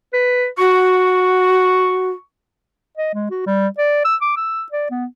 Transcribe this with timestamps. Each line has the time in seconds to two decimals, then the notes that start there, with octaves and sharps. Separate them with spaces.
0.13 B4
0.58 F#4 C#6
2.97 D#5
3.14 G#3
3.31 F#4
3.46 G3
3.78 D5
4.05 E6
4.22 D6
4.37 E6
4.72 D5
4.91 B3